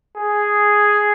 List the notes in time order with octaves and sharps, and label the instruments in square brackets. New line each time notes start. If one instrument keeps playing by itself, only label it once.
[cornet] G#4